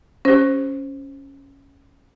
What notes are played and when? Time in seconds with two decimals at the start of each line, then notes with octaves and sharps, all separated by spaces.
0.25 C#4 G4 C5